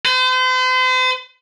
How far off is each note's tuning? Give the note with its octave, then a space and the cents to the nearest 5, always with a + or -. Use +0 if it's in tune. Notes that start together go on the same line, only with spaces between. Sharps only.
C5 -40